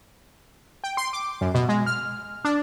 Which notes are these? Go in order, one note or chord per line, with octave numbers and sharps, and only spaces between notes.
G5
C6
D6
F#2
B2
G#3
F6
D4